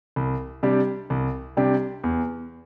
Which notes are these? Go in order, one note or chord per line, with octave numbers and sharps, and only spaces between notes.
C2
C3 G3 D4 G4
C2
C3 G3 D4 G4
E2